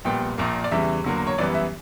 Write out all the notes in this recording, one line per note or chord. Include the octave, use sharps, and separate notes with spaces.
A#1 A#2 G3 B3 G5
A#1 A#2 A#3
D5
E2 C#3 E3 G3 E5
E2 D3 F#3 A#3
C#5
F#2 E3 G3 B3 D5
E5